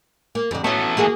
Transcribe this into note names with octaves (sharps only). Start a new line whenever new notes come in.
A#3
F2 D3
E3 A3 B3 C#4 F#4
A#3 F#4 G#4